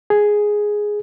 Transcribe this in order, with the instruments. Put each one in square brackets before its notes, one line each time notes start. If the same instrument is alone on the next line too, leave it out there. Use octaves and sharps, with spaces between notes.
[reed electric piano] G#4